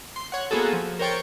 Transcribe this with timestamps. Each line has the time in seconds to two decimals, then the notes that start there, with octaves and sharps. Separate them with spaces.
0.16 C6
0.32 C#5 F#5
0.51 A#3 B3 F#4 G#4 A4
0.73 F3
0.99 A#4 C5 C#5 G5 C#6 A6